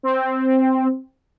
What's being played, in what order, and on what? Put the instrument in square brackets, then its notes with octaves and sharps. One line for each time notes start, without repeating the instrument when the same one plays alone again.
[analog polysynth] C4